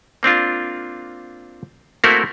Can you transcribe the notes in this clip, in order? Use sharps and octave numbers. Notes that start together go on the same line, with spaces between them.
A#3 C4 D4 F4
A3 A#3 C4 E4 F#4 A#4